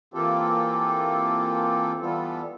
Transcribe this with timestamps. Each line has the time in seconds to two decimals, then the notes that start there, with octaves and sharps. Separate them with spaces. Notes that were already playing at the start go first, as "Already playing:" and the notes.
0.14 E3 A#3 C4 F4 G4 A4
2.01 E3 G3 B3 F4 A4